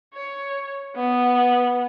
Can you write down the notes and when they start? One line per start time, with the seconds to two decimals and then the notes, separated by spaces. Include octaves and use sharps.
0.14 C#5
0.96 B3